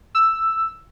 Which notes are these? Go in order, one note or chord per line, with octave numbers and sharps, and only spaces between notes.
E6